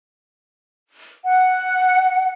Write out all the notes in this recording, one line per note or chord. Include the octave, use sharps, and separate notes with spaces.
F#5